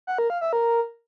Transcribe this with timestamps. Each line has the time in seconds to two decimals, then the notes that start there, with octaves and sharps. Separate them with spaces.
0.07 F#5
0.18 A#4
0.30 F5
0.41 E5
0.53 A#4